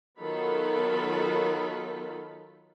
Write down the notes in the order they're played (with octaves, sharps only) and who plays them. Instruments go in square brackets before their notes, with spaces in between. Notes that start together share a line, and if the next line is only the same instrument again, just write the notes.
[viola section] D#3 F#3 B3 F4 A4 B5